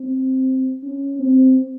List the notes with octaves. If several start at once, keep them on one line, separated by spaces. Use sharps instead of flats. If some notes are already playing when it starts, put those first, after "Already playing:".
Already playing: C4
C#4
C4